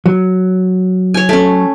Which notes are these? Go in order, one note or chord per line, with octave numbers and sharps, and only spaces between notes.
F#3
C#5 G#5
A3 C#4